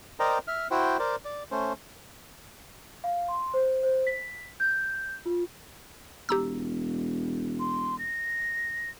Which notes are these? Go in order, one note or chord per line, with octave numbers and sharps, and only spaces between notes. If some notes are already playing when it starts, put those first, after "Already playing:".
A#4 C5 D5 D#5 G5 A#5
E5 F6
E4 F#4 C5 G5
A#4 C5 D5
D5
A3 C#4 C5
F5
C6
C5
C5
B6
G6
F4
E1 G4 A#5 E6
C6
A#6